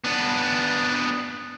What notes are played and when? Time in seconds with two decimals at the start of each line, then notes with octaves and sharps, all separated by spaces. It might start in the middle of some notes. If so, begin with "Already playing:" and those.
0.04 B3 D4